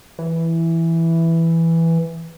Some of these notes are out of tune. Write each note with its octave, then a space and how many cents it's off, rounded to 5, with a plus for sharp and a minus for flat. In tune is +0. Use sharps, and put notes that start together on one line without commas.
E3 +0